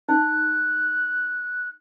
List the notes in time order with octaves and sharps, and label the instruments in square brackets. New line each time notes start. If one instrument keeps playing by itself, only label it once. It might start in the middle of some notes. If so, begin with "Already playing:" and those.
[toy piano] D#4 [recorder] F#6